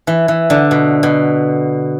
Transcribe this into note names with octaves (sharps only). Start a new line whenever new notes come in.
E3
E3
D3
B2
B2